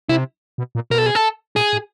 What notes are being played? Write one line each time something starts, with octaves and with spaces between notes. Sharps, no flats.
C3 E4
B2
A#2
B2 A#4
A4
G#4
A4
A#2 G#4
A2